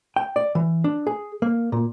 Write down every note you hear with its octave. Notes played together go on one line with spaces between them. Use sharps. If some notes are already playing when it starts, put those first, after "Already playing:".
G5
D5
E3
D4
G#4
A#3
A#2